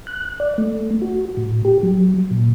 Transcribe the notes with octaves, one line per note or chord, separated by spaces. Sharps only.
F#6
D5
A3
F#4
A2
G4
F#3
A#2